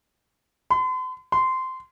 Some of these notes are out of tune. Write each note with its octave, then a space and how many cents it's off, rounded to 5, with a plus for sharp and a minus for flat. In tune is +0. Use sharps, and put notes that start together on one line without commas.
C6 -45
C6 -15